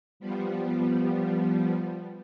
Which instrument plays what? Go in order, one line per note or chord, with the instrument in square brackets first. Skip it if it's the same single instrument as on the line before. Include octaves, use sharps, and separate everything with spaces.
[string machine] F3 G3 B3